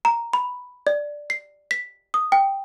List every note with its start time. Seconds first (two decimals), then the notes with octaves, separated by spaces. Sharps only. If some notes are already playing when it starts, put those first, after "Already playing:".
0.05 A#5
0.33 B5
0.87 D5
1.30 C7
1.71 B6
2.14 D#6
2.32 G5